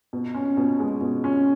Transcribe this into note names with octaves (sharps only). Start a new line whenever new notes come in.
B2
C#4
B2
G#3
B2
C#4